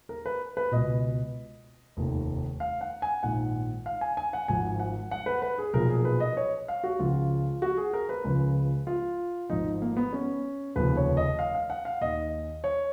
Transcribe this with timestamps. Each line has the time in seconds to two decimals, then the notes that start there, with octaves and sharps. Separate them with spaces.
0.09 A#4
0.26 B4
0.57 B4
0.72 C#2 B2 D#5
1.97 F1 D#2 D#3
2.60 F5
2.81 F#5
3.02 G#5
3.23 A#1 G#2 D#3 F#5
3.86 F5
4.01 G#5
4.17 G#5
4.33 F#5
4.48 G#1 G#2 F3 G#5
4.80 F#5
5.11 F#5
5.26 B4
5.42 B4
5.58 G#4
5.73 B1 A#2 F3 A#4
5.90 G#4
6.05 B4
6.20 D#5
6.37 C#5
6.68 F5
6.84 F#4
6.99 C#2 C#3 F3 F4
7.62 F#4
7.77 G#4
7.93 A#4
8.09 B4
8.24 C#2 C#3 F3
8.87 F4
9.50 G#1 G#2 F3 D#4
9.82 A#3
9.97 B3
10.13 C#4
10.75 F1 D#2 C#3 F3 B4
10.97 C#5
11.17 D#5
11.39 F5
11.54 F5
11.70 F#5
11.85 F5
12.01 D#2 D#3 D#5
12.64 C#5